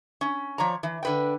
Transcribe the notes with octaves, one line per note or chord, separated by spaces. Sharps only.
C#4
F3 C#5 D5 A#5
E3
D3 B4 G5